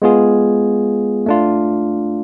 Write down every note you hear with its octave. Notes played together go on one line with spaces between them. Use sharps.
G#3 B3 F4 G#4
A3 D4 F4